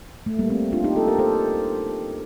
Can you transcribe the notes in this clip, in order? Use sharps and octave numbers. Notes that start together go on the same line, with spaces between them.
A3
G3 A#3
A3 C4
D4 F4
D#4 G4
F4 A4
G4 A#4
A4 C5